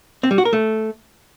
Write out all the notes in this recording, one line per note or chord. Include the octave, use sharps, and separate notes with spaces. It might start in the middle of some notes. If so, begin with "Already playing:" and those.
C4
G3
F#4
A#4
A3